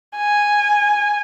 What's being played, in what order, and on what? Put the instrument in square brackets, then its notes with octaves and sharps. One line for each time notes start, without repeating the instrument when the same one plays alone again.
[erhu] G#5